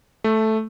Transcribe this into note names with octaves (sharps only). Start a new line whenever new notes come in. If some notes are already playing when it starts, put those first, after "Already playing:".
A3